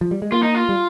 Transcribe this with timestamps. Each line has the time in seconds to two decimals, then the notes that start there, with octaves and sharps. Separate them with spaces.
0.01 F3
0.11 G3
0.22 G#3
0.32 A#3 F4
0.43 D#4
0.55 F4
0.69 G3